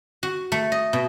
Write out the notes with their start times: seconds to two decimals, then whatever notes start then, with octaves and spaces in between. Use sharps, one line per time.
0.23 F#4
0.52 A3
0.72 D#5
0.93 B2